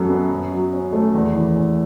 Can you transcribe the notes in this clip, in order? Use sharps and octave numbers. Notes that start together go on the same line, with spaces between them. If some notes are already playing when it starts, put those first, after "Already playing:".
Already playing: F#2 F#3 A4
B3
F#2
F#3
C#4
A3
E2
E3
E2